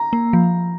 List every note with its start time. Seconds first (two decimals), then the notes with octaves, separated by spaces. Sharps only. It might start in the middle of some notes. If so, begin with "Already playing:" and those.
Already playing: A#5
0.13 A#3
0.33 F3